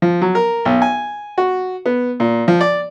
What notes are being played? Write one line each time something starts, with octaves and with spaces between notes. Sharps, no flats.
F3
F#3
A#4
B1
G#5
F#4
B3
A#2
F3
D5